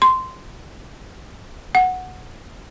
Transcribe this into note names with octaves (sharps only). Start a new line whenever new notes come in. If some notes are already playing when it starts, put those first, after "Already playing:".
C6
F#5